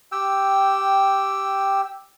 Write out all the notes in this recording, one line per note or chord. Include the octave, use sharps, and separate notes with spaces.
G4 G5 E6